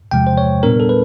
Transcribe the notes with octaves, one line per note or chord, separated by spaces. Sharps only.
E2 C3 F3 G#3 G5
C5
C#5
A#2 G3 B3 D4 A#4
A4
B4